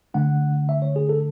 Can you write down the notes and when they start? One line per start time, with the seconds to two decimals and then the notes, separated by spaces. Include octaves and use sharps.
0.14 D3 A3 D4 F#5
0.69 E5
0.82 C#5
0.96 G#4
1.09 A4